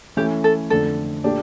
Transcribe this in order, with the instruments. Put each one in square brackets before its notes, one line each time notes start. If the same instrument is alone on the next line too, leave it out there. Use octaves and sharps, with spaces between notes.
[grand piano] E3 A3 C#4 [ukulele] G4
[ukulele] A4
[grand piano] F2 D3 A3 [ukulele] A4
[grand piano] A#2 A3 D4 G4